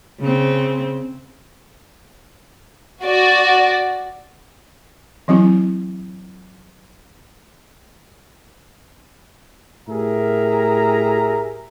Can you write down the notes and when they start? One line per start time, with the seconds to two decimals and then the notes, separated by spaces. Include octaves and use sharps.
0.20 C#3 C4
3.02 F#4 D5
5.28 E3 F#3 C4 E4
9.88 A2 G4 G#4 A#4 E5 A#5